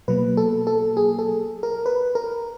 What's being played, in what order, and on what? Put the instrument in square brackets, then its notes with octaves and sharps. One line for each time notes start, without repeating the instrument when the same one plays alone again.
[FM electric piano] B2 F#3 A#3 B4
A4
A4
G#4
A4
A#4
B4
A#4